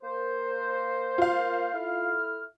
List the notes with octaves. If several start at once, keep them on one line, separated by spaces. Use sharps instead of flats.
A#3 A#4 C5
F4 F5
E4 A4 F6